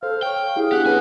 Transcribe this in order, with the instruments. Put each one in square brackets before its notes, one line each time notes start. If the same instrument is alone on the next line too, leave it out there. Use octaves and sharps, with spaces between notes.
[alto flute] A4 [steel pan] C5 [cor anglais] F5
[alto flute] C#5 [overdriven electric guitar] G5
[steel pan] E4 G4 F5 [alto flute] G#4
[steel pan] B3 D4 F5 [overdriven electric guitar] G4 [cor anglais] F#5
[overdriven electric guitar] F#3 G#5 [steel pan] C#4 B4 [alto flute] G#4